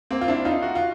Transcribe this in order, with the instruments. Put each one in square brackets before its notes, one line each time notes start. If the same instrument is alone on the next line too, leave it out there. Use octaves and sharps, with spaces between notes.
[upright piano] A#3 C4
F4
D4 E4
D#4 F4
F#4
F4